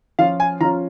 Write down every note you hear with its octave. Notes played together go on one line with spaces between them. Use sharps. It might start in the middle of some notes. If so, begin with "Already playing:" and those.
F3 C#4 F4 F5
G#5
F3 C#4 F4 A#5